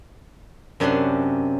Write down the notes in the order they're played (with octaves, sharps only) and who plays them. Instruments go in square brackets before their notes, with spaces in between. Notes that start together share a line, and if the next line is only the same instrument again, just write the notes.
[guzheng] F#2 C3 C#4 D4 F#5 C6